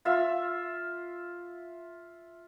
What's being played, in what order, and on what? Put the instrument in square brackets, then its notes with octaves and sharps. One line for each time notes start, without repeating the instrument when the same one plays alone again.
[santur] F4 E5